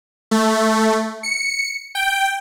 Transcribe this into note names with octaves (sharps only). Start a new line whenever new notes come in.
A3
C#7
G5